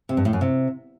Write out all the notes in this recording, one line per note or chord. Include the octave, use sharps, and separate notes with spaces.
C3
G2
A2
F#2
C3